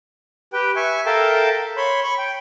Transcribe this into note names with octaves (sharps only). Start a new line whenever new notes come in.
G4 B4 G5
E5 G#5 C#6
A4 A#4 E5 F5 G5 A5
C#5 B5 C6
B5 C#6
G5